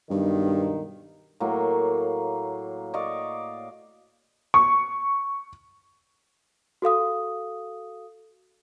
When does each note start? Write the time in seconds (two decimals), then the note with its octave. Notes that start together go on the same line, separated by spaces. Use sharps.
0.10 B1 G2 D#3
1.40 A2 F#3 A#3
2.94 D5 D#5 F5 C#6
4.54 C#6
6.82 F#4 A4 F5 D#6